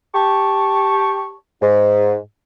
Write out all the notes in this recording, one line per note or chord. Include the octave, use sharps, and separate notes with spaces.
G4 A5 C#6
G#2